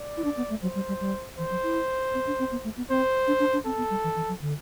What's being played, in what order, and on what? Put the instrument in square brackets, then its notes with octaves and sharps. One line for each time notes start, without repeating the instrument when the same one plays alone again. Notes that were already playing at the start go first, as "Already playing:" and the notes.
Already playing: [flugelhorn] D5
[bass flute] E4
D4
B3
A3
[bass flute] F#3 [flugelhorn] C5
[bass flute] G3
G3
G3
[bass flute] E3 [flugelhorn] C5
[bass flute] F#3
E4
C4
D4
C4
B3
A3
B3
[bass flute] C4 [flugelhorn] C5
[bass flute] D4
D4
D4
[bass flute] C4 [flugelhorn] A4
[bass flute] B3
G3
E3
E3
F#3
D3